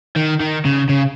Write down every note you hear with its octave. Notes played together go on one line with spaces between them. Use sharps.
D#3
D#3
C#3
C#3